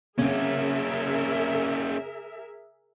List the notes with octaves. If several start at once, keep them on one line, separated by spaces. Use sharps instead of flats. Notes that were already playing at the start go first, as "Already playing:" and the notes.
C#3 A#3 C4 C#4 G#4 A#4 E5